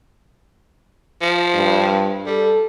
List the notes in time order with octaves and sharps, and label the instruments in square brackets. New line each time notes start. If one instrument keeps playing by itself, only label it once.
[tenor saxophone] F3
[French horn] G2
[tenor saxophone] G3 [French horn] A4